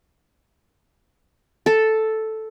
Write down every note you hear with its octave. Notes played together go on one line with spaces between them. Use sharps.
A4